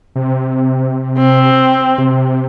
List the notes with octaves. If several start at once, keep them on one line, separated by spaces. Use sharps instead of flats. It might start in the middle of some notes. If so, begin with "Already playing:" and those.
C3
C4
C3